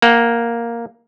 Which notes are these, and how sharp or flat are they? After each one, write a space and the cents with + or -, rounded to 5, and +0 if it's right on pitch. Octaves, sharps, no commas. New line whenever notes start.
A#3 +0 F#5 +35